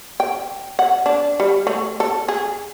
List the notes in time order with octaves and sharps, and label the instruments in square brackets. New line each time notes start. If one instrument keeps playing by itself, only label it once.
[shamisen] G5
F#5
D4
G3
A3
A4
G#4